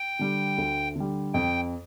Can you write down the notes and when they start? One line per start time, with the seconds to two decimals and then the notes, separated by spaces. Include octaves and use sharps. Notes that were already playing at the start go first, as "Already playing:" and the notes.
Already playing: G5
0.19 D3 G3
0.58 D2
0.96 D3 G3
1.34 F2 G5